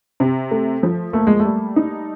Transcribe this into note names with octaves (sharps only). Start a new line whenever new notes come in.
C3
A3
F3
A3 A#3
G#3
A3
G3
D#4